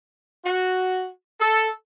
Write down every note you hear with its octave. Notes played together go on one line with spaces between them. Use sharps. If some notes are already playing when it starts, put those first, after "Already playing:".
F#4
A4